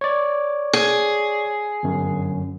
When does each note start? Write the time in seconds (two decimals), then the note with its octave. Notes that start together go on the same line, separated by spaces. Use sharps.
0.01 C#5 D5
0.73 G#4
1.83 G1 F#2